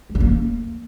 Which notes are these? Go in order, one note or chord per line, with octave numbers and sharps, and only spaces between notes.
G#3
C#3
A#3